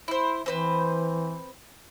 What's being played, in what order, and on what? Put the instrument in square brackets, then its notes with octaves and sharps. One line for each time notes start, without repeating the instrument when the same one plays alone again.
[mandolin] E4 C5
[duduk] E3 [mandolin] C4 B4 C5